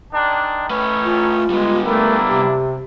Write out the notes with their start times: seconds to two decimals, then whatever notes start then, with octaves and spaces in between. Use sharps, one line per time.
0.13 D#3 G#3 D4
0.70 A2 D#3 A3 C#4 B4
1.04 F4
1.50 G3 G#3 B3
1.86 A3 A#3 D4 E4 A#4
2.27 C3 G4